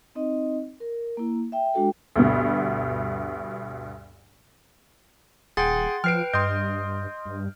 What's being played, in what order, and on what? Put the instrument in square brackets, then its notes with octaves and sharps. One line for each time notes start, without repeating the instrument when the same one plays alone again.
[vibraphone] C4 D#4 D#5
A#4
A#3 E4
E5 G5
G#3 D4 F#4 A4 G5
[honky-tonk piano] D2 G2 B2
[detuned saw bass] D#1 [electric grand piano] G#4 G5 [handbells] F#5 C6 A6
[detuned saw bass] F3 [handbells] B4 G5 [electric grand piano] F6 C7 D7
[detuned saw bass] G2 [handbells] D#5 [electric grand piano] C6 D#6 G6
[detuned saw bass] G2